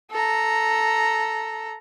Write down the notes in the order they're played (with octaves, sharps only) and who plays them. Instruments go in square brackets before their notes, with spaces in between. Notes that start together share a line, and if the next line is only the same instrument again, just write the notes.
[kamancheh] A4 A#5